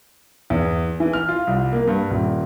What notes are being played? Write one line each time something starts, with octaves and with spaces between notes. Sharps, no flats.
E2
E3
F6
F4
C2
A#3
G2
D#1